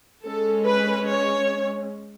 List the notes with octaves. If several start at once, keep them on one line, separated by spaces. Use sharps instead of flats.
G#3 C#4 A4
B4
C#5